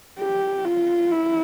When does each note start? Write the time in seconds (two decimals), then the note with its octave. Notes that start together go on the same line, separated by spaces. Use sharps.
0.19 G4
0.65 F4
1.12 E4